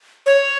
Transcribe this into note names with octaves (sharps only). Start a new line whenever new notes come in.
C#5